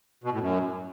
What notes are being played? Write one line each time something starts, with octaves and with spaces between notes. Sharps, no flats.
B2
A2
F#2